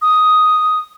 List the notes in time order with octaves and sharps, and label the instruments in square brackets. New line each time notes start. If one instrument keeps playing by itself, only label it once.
[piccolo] D#6